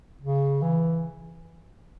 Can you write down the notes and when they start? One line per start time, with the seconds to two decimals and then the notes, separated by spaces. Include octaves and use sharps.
0.21 C#3
0.62 E3